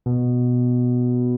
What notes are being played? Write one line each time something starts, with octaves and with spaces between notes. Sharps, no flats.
B2